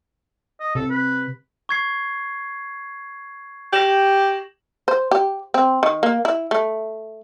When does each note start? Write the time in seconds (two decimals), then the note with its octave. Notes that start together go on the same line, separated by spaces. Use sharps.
0.60 D#5
0.75 C3 A4
0.90 B4
1.69 C#6 G#6 C7
3.73 G4 A#6 E7 F#7
4.88 C5
5.11 G4
5.54 C4
5.83 D#3
6.03 A#3
6.25 E4
6.51 A3